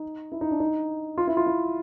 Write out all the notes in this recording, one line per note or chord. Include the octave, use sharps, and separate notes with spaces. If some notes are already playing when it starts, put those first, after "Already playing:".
Already playing: D#4
E4
D#4
D4
D#4
F4
E4
F4
E4